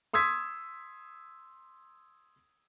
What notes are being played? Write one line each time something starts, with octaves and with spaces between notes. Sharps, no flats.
C6 D#6 E6 G#6 B6